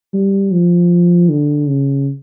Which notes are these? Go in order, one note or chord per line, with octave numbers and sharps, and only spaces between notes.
G3
F3
D3
C#3